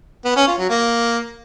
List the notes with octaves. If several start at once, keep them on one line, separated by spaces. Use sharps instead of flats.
B3
C#4
F4
F#3
A#3